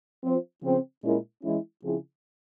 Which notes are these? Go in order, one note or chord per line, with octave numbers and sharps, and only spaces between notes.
F3 C4 F4 C5
C#3 F3 C4
A#2 G#3 C#4 E4 A#4
E3 G#3 C#4 E4
C#3 F3 C4 E4 G#4